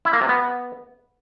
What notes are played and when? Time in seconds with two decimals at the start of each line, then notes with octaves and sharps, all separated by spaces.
0.05 E4
0.13 A#3
0.21 C3
0.29 B3